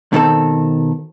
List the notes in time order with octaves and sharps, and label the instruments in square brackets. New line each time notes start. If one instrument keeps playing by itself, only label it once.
[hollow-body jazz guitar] B2 D#3 C4 A4